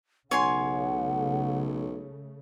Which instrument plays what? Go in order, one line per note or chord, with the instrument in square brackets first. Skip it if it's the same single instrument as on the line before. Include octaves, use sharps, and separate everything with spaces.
[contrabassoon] B1 [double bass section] C#3 A3 [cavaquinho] C#5 G#5 C6 [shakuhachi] F#5